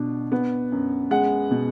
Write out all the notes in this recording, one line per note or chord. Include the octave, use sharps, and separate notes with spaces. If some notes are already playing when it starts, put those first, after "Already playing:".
Already playing: B2 D4
B3
F#2
G#3 F#5
B2